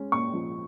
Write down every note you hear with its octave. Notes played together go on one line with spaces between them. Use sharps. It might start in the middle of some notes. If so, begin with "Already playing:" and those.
Already playing: G#3 C#4
A#2 C#6
F3